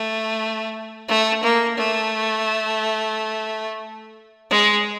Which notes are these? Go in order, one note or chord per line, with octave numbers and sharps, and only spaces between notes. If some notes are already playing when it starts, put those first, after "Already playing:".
Already playing: A3
A3
A#3
A3
G#3